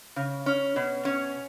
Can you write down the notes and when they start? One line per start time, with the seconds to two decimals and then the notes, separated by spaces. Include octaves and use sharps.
0.16 C#3
0.46 C#4
0.76 B2
1.05 C#4